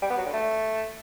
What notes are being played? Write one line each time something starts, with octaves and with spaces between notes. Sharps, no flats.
G3
B3
F#3
D3
A3